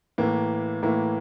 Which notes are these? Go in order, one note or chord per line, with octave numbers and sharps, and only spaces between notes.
A2 E3 A#3
A2 E3 A#3